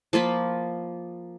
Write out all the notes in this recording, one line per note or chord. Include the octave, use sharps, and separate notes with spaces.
F3 A#3 F4 B5